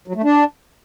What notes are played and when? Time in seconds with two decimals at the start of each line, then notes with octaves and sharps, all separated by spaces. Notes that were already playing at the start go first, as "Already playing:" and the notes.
0.08 F#3
0.16 A3
0.23 D4